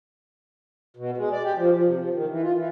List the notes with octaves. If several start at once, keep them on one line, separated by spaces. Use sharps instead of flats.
B2
G#3
D5
G4
F3
F3
C3
F3
D#3
E3
F4
E3